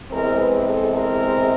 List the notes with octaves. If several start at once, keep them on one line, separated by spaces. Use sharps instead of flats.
E2 C3 E3 G#3 C4 A#4
B4
A4
A#4